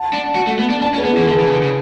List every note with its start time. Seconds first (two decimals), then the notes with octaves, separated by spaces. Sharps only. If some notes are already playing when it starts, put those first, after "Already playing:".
Already playing: F#5 A5
0.13 D4
0.35 F#4
0.47 A3
0.59 B3
0.70 D4
0.81 D4 F#5 A5
0.94 C#4
0.97 G#4 B4
1.04 B3
1.12 E3 E4 G#4
1.22 E3
1.28 D3 G#4 B4
1.40 E3
1.45 C#3
1.51 D3
1.63 C#3